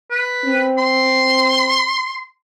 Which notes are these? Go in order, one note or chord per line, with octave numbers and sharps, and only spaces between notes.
B4
C4
C6